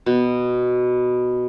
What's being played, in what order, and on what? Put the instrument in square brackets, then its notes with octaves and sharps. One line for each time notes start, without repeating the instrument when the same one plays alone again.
[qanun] B2